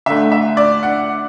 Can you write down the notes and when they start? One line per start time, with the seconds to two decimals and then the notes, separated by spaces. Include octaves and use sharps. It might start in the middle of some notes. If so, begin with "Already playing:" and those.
0.06 D3 A3 E5
0.32 E5
0.57 D5
0.83 F#5